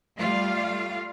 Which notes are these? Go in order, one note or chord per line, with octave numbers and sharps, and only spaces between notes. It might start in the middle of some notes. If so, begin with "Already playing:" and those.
G3 A3 F4 F5